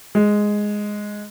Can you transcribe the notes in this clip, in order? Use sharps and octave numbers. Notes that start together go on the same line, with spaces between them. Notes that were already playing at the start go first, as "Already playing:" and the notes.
G#3